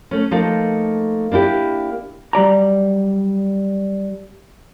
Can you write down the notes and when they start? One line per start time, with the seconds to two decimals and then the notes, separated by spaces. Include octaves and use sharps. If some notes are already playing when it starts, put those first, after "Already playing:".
0.11 A3 C#4
0.31 F3 A3 A#3 D#4 A4
1.32 A#3 D4 E4 G4
2.33 F#3 G3 D5 A#5